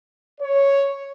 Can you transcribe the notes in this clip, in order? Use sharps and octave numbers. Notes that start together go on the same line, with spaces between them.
C#5